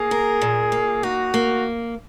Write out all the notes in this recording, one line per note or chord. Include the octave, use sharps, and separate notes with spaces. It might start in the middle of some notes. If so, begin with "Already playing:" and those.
Already playing: A#3 G#4
A#4
A#2
A#3
D#4 F#4
A#3